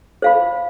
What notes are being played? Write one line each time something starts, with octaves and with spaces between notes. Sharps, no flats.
C5 F5 B5